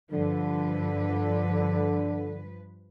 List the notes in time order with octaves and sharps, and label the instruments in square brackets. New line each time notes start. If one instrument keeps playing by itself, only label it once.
[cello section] G2 F3 B4 [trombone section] D3